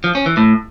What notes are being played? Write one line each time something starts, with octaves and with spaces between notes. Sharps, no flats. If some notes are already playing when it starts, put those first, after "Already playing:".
F3
C#4
E3
A2